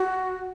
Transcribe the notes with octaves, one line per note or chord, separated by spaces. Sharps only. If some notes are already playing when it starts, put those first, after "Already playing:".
Already playing: F#4